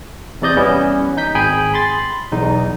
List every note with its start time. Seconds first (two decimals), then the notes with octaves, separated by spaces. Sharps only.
0.42 E2 C3 D5 D#5 G6
0.56 E3 G3 B3 C#4 E4
1.17 D#4 G6 B6
1.35 G#1 G#4 G5 G#5 B5 G6
1.74 B5 C6 A6
2.32 B1 E2 D#4